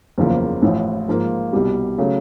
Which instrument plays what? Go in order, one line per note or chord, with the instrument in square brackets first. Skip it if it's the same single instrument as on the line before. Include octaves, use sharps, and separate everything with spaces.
[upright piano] F#1 E2 C#3 F3 A#3
A1 A2 F3
G#2 F3 A#3
C2 B2 G3
C#3 F#3 A3